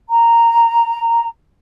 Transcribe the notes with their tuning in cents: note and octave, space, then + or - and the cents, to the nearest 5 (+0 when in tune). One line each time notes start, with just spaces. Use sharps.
A#5 -10